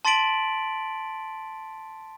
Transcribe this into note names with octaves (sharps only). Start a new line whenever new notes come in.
A5 C6 A6 B6 D7 F#7